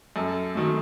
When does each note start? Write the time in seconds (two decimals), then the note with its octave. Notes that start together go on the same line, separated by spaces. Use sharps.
0.16 F#2 A4
0.55 D#3 F#3 A3